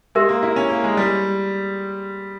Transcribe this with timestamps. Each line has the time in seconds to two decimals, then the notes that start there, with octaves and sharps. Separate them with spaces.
0.15 G#3 G4 A#4 E5
0.29 A#3
0.43 E4
0.56 C#4
0.70 A#3
0.84 G#3
0.97 G3